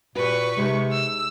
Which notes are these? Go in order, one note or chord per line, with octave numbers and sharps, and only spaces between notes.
A#2 F#4 G4 B4 C#6
C3 G#3 D#4
E6